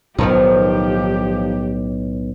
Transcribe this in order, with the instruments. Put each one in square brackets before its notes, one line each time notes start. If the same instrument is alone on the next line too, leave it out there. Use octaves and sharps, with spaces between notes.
[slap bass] B1 A2 [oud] D#3 F3 B3 [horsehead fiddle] G4